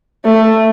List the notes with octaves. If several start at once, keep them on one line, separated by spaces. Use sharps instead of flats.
A3